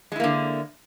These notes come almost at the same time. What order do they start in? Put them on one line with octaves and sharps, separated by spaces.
G#3 E4 A#3 D3